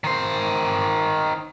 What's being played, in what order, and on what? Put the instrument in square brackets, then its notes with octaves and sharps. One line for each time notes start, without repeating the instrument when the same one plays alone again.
[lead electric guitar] D#3 C5